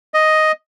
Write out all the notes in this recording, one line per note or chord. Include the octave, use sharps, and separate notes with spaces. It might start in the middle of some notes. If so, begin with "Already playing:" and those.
D#5